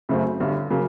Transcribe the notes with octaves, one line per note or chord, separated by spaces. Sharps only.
F#2 C#3 F#3 A3 C4
G1 G2 D3
C#3 F#3 A#3